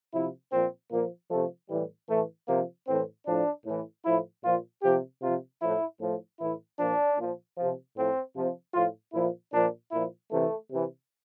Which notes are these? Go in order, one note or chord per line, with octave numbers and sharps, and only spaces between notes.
C3 F3 E4
A#2 F3 C4
A#2 F3 A#3
C3 F3 A3
A2 E3 G3
A2 E3 A3
C3 F3 A#3
A2 E3 C4
A2 F3 D4
A2 E3
A2 F3 E4
A#2 F3 F4
C3 F3 G4
C3 F3 F4
A2 F3 E4
A2 F3
A2 E3 E4
A#2 F3 D4
A#2 F3
C3 F3
A2 F3 C4
C3 F3
A2 F3 F4
A#2 F3 E4
A#2 F3 D4
A#2 F3 E4
C3 E3 A3
C3 E3